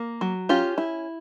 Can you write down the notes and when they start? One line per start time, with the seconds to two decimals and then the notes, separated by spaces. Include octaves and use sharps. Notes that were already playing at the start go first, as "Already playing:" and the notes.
Already playing: A#3
0.21 F#3
0.49 C#4 F4 G4
0.78 E4